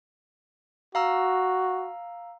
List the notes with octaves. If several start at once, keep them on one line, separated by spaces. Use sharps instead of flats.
F#4 F5 A#5 E6